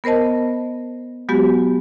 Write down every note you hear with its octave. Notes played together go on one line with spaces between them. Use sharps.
B3 A#4 C5 D#5 A5
F#3 G#3 B3 F#4 G4